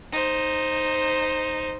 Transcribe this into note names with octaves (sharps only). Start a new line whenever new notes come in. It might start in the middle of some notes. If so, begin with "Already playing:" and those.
D#4 C5